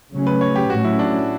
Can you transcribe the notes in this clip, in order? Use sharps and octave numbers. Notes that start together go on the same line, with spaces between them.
C#3 F#3 A3 C#4
B4
C#5
G4
A2 F#3 A3 C#4 F#4
E4
D4